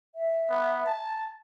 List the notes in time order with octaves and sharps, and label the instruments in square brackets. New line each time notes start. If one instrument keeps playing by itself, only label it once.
[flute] E5
[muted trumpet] B3
A5